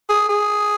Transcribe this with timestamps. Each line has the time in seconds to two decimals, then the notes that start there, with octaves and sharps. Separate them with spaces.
0.10 G#4
0.29 G#4